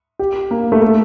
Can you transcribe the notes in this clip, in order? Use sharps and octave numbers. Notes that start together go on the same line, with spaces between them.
G4
A#3
A3
A3